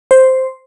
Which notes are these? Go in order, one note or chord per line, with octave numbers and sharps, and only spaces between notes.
C5